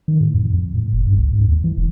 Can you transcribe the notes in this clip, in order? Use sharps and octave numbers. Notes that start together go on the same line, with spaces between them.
D#3
A2
F2
F2
A2
F#1
G2
C#2
G#2
D#2
E3
E1